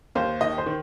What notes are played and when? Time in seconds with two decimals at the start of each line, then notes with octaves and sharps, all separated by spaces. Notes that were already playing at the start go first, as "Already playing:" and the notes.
0.15 D#2 C5 F5
0.41 D#3 D#5
0.58 C5
0.66 D#3